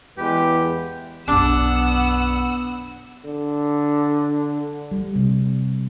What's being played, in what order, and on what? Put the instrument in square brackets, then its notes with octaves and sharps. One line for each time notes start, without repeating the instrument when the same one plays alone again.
[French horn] E2 [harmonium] G#3 B4 [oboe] G4
[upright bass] B1 F#2 [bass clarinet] B3 [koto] D4 [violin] F#5 E6
[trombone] D3
[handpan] G3
C3